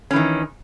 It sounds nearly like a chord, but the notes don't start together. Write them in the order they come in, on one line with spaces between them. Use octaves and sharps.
C#4 E3 D#3